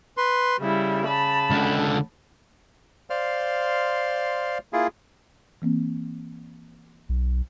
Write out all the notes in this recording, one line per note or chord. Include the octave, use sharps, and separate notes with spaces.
B4 C6
C#3 G3 E4
A5 B5
C#2 D3
C5 D5 F5 C6 F6
A#3 E4 F4 G#4
E3 A#3 C4
B1